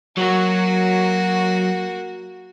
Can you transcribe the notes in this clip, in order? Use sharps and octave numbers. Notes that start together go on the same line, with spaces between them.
F#3 A#3 F#4